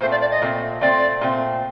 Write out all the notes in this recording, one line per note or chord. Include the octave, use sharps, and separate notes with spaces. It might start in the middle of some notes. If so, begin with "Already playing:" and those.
A#2 A3 C4 C5
D5
D5
D#5
A#2 A3 C4
A#2 A3 C4 D5
A#2 A3 C4